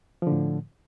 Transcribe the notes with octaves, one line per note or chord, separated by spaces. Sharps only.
A2 D3 F3